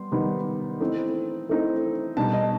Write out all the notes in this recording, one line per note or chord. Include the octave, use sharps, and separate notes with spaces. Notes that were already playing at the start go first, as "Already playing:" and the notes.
Already playing: G3 B3 C6
D#3 G3 B3 D#4
E3 A3 C4 D#4
E3 A3 C4 D#4
B2 G3 D#4 A5
D#5